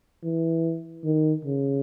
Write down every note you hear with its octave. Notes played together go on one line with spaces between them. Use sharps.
E3
D#3
C#3